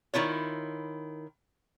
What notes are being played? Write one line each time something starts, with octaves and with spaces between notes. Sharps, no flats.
D#3 E4 F4 C#5